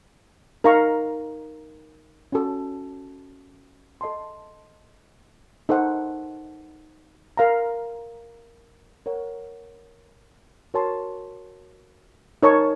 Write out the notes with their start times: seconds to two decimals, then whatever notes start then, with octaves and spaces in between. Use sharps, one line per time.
0.64 D#4 A#4 F5 A#5 C#6
2.32 C#4 F#4 A4
4.01 A4 D#5 A5 C6
5.69 D#4 A4 C5 F#5
7.37 A#4 F5 A#5
9.06 A#4 C#5 F#5
10.74 F#4 A#4 C#5 A5 C6
12.43 D#4 A#4 C#5 A5 C#6